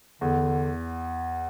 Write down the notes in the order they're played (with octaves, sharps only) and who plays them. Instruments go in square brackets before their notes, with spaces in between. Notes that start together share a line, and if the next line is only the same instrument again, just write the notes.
[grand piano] E2 [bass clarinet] D3